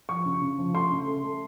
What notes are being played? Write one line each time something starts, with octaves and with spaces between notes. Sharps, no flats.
F3 C#6
C#3
C#3
F3
A3 C6
C#3
A3
A3